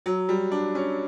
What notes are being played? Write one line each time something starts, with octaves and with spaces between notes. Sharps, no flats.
F#3
G3
D4
C#4